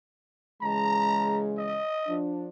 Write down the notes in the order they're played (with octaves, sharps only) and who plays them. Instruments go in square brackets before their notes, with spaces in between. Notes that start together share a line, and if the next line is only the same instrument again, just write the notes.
[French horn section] C#3 E3 G#3 [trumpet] A#5
[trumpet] D#5
[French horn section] F3 D4